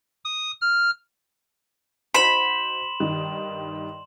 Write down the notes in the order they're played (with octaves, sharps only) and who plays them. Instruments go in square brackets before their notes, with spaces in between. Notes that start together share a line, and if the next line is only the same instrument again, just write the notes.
[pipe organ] D#6
F6
[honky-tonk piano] D#4 F#4 C5 [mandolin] B5 [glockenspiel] C6 E7 F#7
[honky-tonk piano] G2 D#3